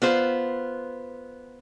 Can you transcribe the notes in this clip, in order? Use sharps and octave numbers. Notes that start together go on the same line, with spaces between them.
B3 F4 C5